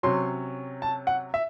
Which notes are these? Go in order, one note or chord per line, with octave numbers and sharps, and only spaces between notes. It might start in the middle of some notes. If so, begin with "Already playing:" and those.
C3 F#3 C#4 C6
A5
F#5
E5